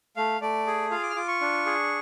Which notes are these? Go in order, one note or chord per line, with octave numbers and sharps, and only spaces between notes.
A3 F5
A3 D5
G#4
F4 F5
D6
F6
F4 D6
C#6
D4
G#4